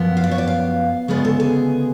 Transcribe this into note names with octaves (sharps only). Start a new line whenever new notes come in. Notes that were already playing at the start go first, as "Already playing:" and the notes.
Already playing: F#2 F3 B3
F5
D5
C#5
D5
F5
D2 C#3 G#3 B3 D5
A4
G#4